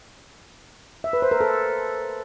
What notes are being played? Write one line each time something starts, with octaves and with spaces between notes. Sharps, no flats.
E5
B4
C5
A#4
A4